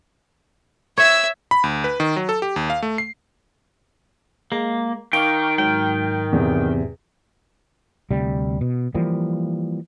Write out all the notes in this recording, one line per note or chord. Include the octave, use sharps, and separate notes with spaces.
C#5 E5 E6
B5
D2
B4
D#3
F#3
A4
G4
D#2
F5
A3
C7
G#3 A#3
D#3 F5 G5 C#6 D6
G#2 F#3 G5
E2 C3
D2 C3 G3
B2
E3 F3 G3 A#3